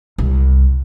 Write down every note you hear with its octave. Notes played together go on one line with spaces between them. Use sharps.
C2